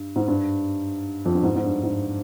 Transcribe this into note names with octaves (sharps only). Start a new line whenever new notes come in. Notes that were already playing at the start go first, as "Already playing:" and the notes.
Already playing: G2
G#2
G2
F2
G2
G#2
G#2
G2
G#2